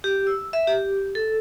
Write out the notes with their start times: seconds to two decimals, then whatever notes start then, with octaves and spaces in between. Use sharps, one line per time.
0.04 G4
0.27 E6
0.53 E5
0.67 G4
1.15 A4